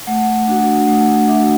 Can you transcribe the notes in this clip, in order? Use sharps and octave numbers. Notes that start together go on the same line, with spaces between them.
A3 F#5
D4 F#4 F#5
A3 F#5
D4 F#4 E5